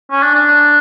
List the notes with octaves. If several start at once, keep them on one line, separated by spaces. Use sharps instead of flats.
C#4
D4
D4